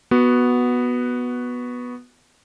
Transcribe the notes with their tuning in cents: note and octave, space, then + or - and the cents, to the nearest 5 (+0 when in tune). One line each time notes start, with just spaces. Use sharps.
B3 -5 F#4 +0